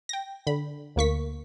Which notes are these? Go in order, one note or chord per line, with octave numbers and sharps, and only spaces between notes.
G5 A#6
D3 B5
D2 A#3 C#6 B6